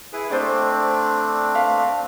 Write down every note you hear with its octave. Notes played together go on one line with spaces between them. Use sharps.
E4 G#4 B4
A3 C4 D4 C5 D5 D#5
B4 F5